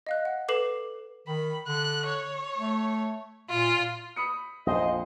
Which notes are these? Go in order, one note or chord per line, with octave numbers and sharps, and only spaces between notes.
D#5 F5 F#6
F#5
A4 B4 D6 C7 E7 F#7
D#3 B5
D3 F#6
C#5
A3
A#2 F4
B5 D#6 C#7
A#1 F2 C5 D#5